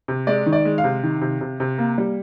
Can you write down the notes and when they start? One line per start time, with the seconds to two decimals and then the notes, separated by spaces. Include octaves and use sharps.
0.08 C3
0.27 G#3 D5
0.46 D#3
0.53 D5
0.65 G#3
0.78 F5
0.84 C3
1.03 D#3
1.21 C3
1.41 C3
1.60 C3
1.78 A#3
1.98 G3